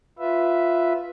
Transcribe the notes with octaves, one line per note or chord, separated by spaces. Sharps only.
F4 B4 E5